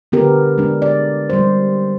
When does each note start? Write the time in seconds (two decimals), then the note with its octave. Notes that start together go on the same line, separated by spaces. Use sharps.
0.12 D3 B3 G4 A#4
0.58 G#3 D4
0.82 D5
1.30 G3 C5